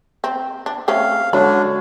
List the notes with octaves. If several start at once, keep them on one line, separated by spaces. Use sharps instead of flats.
C4
D4
A3 C4 C#4 F5
D3 G#3 D4 F#4 C#5 B5